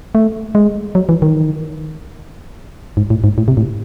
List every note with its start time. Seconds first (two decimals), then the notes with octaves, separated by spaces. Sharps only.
0.15 A3
0.55 G#3
0.95 F#3
1.09 E3
1.22 D#3
2.97 G#2
3.10 A2
3.24 G#2
3.38 A2
3.48 C3
3.57 A2